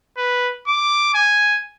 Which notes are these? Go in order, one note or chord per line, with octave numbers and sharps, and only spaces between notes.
B4
D6
G#5